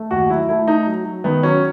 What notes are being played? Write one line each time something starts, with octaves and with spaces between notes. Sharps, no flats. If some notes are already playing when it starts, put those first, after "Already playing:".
Already playing: A3
D#2 F#4
F#3 E4
A3 E4
A3 D#4
F#3
F#3
D#3 B3
F#3 C#4